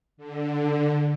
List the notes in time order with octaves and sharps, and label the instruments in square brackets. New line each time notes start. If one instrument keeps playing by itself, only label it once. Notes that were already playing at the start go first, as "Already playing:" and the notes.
[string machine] D3